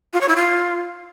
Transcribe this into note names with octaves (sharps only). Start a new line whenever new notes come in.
F4
C#5
E4
F4